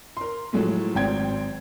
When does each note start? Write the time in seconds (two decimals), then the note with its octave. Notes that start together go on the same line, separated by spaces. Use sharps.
0.17 A#4 C6
0.53 A2 F3 F#3 G#3 A3
0.95 G#1 C4 G5 G#6